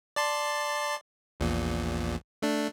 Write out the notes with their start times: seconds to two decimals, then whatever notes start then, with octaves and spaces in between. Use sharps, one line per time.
0.16 D5 A5 C6
1.40 A#1 E2 A#2
2.42 A3 D4